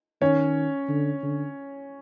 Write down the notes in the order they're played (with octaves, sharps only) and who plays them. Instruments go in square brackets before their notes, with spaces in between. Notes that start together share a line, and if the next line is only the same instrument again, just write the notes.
[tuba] D#3 [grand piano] C#4 C#5
[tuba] D3
D3